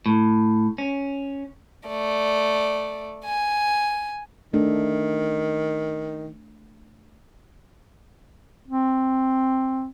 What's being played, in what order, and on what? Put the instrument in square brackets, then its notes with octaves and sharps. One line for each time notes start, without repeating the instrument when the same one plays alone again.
[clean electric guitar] A2
C#4
[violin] A3 D5
G#5
[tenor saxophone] D#3 [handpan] A3 D4 A4
[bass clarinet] C4